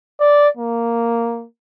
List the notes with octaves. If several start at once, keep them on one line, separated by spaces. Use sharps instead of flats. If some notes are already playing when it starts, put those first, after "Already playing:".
D5
A#3